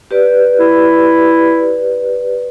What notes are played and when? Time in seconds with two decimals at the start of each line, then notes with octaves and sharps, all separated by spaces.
0.11 G4 B4 D5
0.59 E4